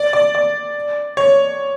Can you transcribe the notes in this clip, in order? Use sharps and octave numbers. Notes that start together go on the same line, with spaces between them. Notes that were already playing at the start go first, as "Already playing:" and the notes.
Already playing: D5
D5
D5
C#5